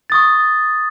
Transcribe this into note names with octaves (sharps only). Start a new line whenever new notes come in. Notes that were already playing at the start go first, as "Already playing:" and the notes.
C#6 D#6 A6